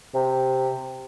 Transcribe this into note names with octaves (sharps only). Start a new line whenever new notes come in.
C3